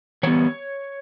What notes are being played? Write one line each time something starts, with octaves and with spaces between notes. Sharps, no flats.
E3 G3 B3 C#5